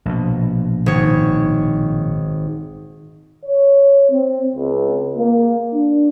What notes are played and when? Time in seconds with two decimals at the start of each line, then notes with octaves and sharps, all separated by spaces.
0.05 A#1 B2
0.86 G#1 C#5
3.44 C#5
4.10 C4
4.56 C#2
5.16 A#3
5.72 D4